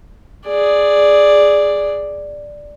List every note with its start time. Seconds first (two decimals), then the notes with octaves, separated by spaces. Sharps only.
0.48 G#4 D5